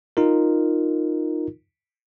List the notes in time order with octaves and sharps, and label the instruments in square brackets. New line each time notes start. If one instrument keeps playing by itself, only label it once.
[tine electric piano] D#4 F4 A#4